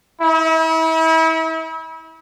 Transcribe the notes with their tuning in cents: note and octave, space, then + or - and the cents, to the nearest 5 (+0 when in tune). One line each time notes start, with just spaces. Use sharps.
E4 -35